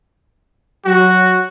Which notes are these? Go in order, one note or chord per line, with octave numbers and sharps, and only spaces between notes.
F#3 F#4